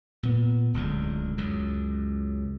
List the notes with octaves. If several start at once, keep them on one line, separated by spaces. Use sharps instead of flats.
A#2 B3
D1 C#2 D3
C#2 F#2